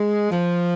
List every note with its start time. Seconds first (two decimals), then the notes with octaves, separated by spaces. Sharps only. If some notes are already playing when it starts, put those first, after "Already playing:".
Already playing: G#3
0.31 F3